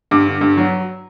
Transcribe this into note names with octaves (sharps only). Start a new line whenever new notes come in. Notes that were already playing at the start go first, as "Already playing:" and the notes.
G2 D6
D3
G2
F#3